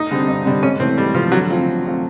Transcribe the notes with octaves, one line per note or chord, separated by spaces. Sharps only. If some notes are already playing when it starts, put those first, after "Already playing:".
Already playing: D#4
D3 G3 C4
G2
D3 G3 C4
G#2 C#4
E3 A3 C4
G#2 G3
E3 F3 A3
D3 F#3
F3 A3 C4 F4
D3
F3 A3 C4 F4